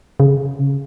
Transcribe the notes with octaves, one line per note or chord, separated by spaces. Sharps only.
C#3